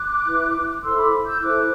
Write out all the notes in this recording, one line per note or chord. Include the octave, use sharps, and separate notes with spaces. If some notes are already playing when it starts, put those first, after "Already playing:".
Already playing: D6 F#6
E4 B4
E4 A4 C5 C6 E6
B5 D6
E6 G6
E4 A4 C5 D6 F#6